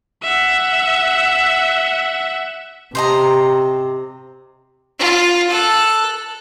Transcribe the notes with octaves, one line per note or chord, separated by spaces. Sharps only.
E5 F#5
C3 C5 D#5 A#5
F4
A4 F#6